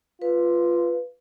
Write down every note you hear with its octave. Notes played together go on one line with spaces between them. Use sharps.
F4 B4